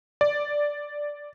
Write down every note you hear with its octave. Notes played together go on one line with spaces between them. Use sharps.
D5